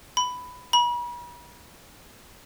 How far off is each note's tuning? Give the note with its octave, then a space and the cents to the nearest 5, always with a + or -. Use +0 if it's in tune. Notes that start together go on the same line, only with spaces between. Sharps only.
B5 +5
B5 -40